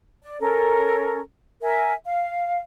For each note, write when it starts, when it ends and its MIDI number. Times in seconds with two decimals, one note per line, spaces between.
0.23 0.39 74
0.40 1.20 61
0.40 1.20 69
0.40 1.20 70
1.62 1.92 70
1.62 1.92 76
1.62 1.92 80
2.05 2.60 77